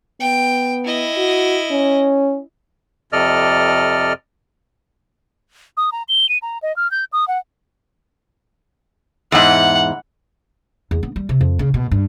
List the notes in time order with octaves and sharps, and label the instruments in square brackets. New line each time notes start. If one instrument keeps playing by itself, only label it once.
[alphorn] B3 [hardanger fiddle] G5
[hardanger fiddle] E4 D#5
[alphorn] F#4
C#4
[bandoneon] F2 C3 A4 D5 D#5 F6
[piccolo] D#6
A#5
G7
D#7
A#5
D#5
F6
G6
D#6
F#5
[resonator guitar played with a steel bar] E2 G#2 [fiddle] F#5
[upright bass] E2
B3
G3
C3
F2
C#3
B2
G2